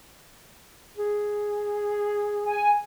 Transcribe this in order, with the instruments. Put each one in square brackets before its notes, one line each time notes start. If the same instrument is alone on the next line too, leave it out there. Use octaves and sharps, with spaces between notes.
[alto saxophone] G#4
[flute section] G#5